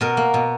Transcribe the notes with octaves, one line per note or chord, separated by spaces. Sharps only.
B2 A#4
A#3
B2